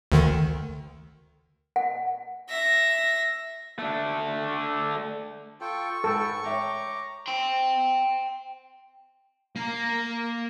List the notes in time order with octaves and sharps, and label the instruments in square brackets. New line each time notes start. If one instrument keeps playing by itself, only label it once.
[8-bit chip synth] D2 D3 D#3
[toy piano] F#5
[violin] E5 A#6
[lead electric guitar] A3 D4
[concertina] F4 A4 G5 [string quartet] C#6
[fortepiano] G#2 [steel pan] A4 [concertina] B4 G5
[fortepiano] C#5 E5 G5 [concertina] A#5 D6
[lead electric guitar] G5 C6
[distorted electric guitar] A#3 A#5